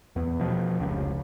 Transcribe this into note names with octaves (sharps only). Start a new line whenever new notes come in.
E2
B2 F3
F1 C#2